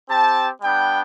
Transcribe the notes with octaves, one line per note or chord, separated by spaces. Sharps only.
C4 G4 A5
G3 B3 D4 G5